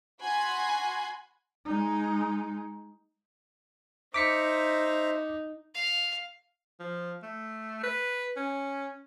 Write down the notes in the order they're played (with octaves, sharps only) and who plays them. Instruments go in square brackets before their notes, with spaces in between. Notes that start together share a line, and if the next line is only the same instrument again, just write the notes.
[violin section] F#4 G#5 B5 C6 F#6 G#6
[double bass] G#3 D#4
[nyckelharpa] D#4 [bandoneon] C5 E5 A#5 [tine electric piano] D6 B6 C#7
[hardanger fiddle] F5
[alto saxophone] F3
A3
B4
C#4